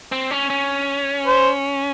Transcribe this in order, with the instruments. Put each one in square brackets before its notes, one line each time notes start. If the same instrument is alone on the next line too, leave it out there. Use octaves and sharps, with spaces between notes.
[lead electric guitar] C4
C#4
C#4
[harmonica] C5